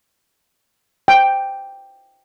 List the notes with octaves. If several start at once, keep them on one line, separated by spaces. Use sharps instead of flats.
G5